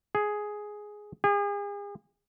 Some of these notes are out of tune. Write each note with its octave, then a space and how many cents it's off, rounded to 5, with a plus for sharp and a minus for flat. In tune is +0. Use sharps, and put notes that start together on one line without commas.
G#4 +5
G#4 -40